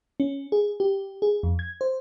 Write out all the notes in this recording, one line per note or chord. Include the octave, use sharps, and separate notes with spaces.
C#4
G#4
G4
G#4
F2
G#6
C5